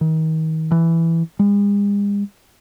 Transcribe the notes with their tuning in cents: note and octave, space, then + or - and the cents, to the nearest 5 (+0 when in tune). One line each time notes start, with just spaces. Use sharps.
D#3 +35
E3 +5
G#3 -45